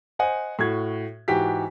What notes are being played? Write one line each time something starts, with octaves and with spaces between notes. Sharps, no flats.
C5 D#5 F#5 G#5
A2 F#4 G#6
G#2 E3 F#4 G4 B6